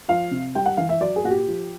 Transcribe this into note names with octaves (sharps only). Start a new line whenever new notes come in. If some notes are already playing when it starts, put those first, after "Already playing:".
F3 F5
C3
G3 G5
F#5
E3 F5
E5
F#3 D5
G#4
A#2 F#4
G4
F3